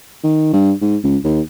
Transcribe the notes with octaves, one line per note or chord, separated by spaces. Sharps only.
D#3
G2
G#2
C#2
D#2